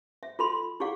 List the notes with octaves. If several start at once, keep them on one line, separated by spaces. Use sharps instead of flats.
E5
F4 A4 B5 C6
C6
E4 G4 G#4 D5 F5 F#5